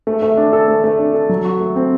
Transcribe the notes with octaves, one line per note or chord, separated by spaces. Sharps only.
A3
A3
D4
A4
A3
A3
D4
A4
F#3
F#4
A3
C4